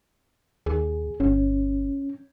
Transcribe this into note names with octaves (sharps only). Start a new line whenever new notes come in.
D#2 G#4
G1 C#4